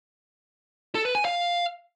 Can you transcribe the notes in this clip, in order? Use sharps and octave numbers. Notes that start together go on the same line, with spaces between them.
A4
B4
G#5
F5